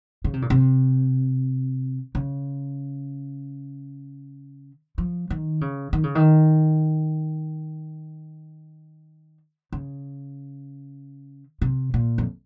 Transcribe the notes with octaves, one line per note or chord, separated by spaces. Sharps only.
C#3
C3
A#2
C3
C#3
F3
D#3
C#3
D#3
C#3
D#3
C#3
C3
A#2
F2